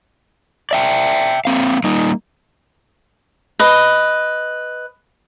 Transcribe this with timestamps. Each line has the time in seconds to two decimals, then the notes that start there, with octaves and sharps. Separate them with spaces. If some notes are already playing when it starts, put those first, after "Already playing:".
0.71 D5 E5 G5
1.45 A#3 C4 F5
1.84 G3 A#3 D#4
3.59 B4 D#5